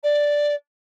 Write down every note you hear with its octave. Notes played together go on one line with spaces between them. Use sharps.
D5